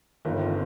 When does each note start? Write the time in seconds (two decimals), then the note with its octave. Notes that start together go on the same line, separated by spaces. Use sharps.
0.25 G1 G2 D#3 F4 A#4
0.40 C4 F4